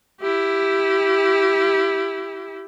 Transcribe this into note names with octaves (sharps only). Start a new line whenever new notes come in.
E4 G4